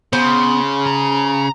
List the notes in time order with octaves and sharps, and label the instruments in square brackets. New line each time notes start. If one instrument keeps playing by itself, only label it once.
[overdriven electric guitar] C#3 [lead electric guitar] B3 [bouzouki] C5
[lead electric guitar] A#5